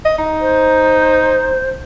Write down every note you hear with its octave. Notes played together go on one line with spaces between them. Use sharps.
D#5
D#4
C5